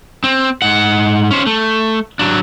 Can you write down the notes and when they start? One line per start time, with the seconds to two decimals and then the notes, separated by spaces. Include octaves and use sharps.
0.24 C4
0.62 G#2 F#5
1.31 C#4 C5
1.47 A3
2.19 F#3 D4